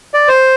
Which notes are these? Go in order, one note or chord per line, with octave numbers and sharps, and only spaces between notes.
D5
C5